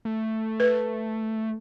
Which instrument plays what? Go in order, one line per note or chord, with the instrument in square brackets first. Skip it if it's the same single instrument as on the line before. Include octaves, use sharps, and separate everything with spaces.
[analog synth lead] A3
[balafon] B4